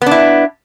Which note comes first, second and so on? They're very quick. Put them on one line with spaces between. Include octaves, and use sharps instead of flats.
B3 D4 E4